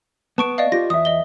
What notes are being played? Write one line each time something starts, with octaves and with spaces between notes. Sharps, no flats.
B3 A5 C#6 D7
D5 D#5 F5
F4 G4 A#6
E2 E5 D#6
D#5 G7